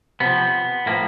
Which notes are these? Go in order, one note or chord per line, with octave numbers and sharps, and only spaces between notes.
C3 F3 B3
A2 F3 A#3